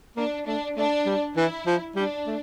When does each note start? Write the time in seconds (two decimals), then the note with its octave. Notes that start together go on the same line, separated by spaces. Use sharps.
0.16 A#3 D4
0.46 A3 D4
0.77 A3 D4
1.06 G3
1.36 E3 E4
1.66 F3
1.95 G3 D4
2.26 A3